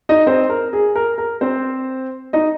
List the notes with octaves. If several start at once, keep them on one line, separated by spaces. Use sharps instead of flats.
D#4 D#5
C4 C5
A#4
G#4
A#4
A#4
C4 C5
D#4 D#5